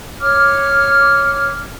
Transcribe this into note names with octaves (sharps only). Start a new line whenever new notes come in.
C#5 D6 F6